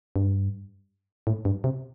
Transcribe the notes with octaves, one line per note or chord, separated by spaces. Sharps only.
G2
A2
G2
C3